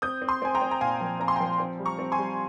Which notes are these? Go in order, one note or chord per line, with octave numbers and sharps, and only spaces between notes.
C4 D#6 G6
C4
C6 D#6
C4 G#5
G5 A#5
C4
A#5
A#2 F5 G#5
F3
C4 A#5
C6
F3 G5 A#5
C4
G3
A#5 C#6
C4
G#5 C6
G3